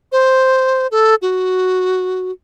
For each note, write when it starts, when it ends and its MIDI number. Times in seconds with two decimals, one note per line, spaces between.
0.12 0.87 72
0.91 1.15 69
1.22 2.31 66